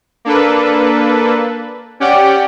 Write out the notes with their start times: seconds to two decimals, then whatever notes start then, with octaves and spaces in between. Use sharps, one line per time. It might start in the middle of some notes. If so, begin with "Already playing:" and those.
0.25 A#3 D4 A4 B4
2.00 C#4 G4 D5 F#5 G5